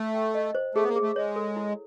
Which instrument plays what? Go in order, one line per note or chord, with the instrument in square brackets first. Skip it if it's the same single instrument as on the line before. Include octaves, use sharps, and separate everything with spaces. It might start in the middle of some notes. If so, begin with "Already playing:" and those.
Already playing: [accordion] A3
[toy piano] G5
D#5
C5
[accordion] A3 [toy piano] G#4
[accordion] B3
A#3
[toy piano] G#4
[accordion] A3
[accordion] G#3 [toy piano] C#5
[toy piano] A4
E4